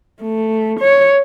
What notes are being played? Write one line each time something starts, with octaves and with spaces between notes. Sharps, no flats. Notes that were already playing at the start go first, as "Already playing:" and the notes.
A3
C#5